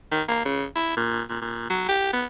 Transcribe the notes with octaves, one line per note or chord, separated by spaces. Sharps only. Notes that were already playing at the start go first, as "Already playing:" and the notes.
D#3
A#3
C#3
E4
A#2
A#2
A#2
F#3
G4
B3